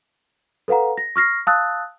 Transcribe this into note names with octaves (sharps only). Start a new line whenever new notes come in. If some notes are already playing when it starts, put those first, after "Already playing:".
A4 B4 F5 F#5 A#5
A#6
C#6 F6 A#6 C7
F5 A5 D#6 E6 F#6 A6